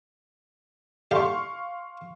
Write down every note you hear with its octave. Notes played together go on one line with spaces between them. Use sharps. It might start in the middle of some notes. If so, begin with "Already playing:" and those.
D3 G4 F5 C6 C#6